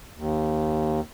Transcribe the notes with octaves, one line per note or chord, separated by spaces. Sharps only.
D#2